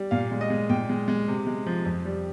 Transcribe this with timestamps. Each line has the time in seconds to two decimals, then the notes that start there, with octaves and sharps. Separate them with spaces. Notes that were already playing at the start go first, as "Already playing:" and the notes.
Already playing: G3
0.11 A#2 F5
0.31 G#3
0.41 D#5
0.50 G#3
0.69 A#2 G5
0.89 G#3
1.08 G#3
1.28 C3
1.47 G#3
1.66 F3
1.85 F2
2.05 G3